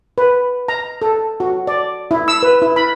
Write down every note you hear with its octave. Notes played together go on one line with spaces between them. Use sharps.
B4
A#5
A4
F#4
D5
E4
E6
B4
E4
B5